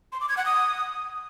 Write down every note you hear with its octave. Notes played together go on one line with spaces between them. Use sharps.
C6
D6
G#6
F#5
D#6